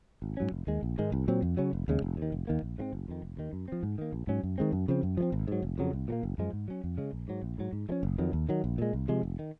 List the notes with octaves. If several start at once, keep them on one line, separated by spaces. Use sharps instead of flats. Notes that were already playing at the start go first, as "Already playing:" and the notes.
G#1
G#2 F#3 C#4
F1
D#2 D#3 G#3
A#1
G#2 D#3 G#3
C2
A#2 F#3 C4
F2
C#3 F#3 C#4
F1
D#2 C#3 G#3
F1
D#2
D#3
F1
D#2 D#3 A#3
A#1
G#2 F3 C4
F#1
F2 D#3
F1
D#2 D#3
F#2
F3 C4
G#2
D#3 A#3
A#1
G#2 F#3 C#4
F#2
D#3 G#3 C4
F#2
C#3 F3 C4
F#2
F3 G#3 C4
G#1
G#2 F#3
F1
F2 C#3 F#3
C2
A#2 F#3 A#3
F#1
F#2 F3 G#3
G#2
F#3 C#4
F2
C#3 G#3
A#1
G#2 F#3
A#1
G#2 F#3
G#2
F3 G#3 C#4
F#1
F2 D#3 F#3
D#2
D#3 F#3
A#1
A#2 G#3
C2
C3 F3 G#3
F1
D#3